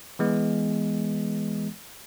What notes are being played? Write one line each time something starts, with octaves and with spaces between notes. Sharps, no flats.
E3 G#3 B3